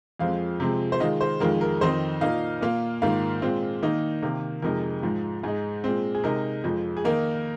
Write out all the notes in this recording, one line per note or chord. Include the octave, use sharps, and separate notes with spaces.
F2 F3 G#3 C4 F5
C3 F3 G#3 C4
C5
D#3 G#3 F4 D#5
C5
F2 D#3 G#3 F4 A#4
A#4
F2 D#3 C4 D#4 C5
A#2 A#3 D#4 F5
A#2 A#3 F4
G#2 D#3 A#3 F4 F5
A#2 G#3 C4 F4
D#3 A#3 D#4
C3 D#3 A#3
F2 C3 G#3 D#4 A#4
G#2 F3 G#3
G#2 G#3 D#4 G#4
A#2 G#3 C4
G#4
C3 G#3 D#4 A#4
F2 F3 G#3
G#4
D#3 A#3 D#4 A#4